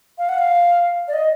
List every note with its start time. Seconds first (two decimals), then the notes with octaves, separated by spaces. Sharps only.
0.18 F5
0.29 F#5
0.38 F5
1.08 D5
1.13 D#5